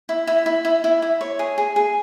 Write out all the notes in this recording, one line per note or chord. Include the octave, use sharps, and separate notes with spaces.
E4
E4
E4
E4
E4
E4
C#5
G#4
G#4
G#4